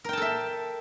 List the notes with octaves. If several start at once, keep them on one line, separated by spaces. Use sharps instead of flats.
A4 A#4 E5 G5 A5